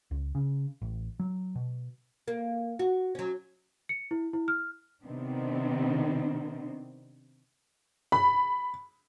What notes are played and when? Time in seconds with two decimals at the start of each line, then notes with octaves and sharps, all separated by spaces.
0.11 C#2
0.35 C#3
0.82 A1
1.20 F#3
1.55 B2
2.28 A#3
2.79 F#4
3.15 F#3 C#4
3.89 C#7
4.11 E4
4.33 E4
4.48 F6
5.05 C3 D#3 B3 C4 D4
8.12 B5